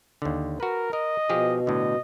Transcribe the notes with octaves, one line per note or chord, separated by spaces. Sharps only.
D#2 D3
F#4 A#4 B4
A#4 D#5
B2 F3 G4 G#4
A2 D3 D#5